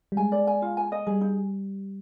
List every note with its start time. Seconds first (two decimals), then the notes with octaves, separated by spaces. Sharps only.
0.12 G3
0.17 G#3 G#5
0.32 D5
0.47 G#5
0.62 F4
0.77 G#5
0.92 D#5
1.07 G3 G#4
1.21 D#4